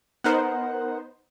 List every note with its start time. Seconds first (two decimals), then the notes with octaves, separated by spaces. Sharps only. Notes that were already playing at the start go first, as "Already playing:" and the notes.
0.24 B3 D#4 A#4 C5 F#5